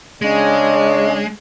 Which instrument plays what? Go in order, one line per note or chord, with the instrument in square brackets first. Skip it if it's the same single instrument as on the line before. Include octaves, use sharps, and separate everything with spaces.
[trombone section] C#3 C#4 D4 [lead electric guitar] G#3 [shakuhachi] D#5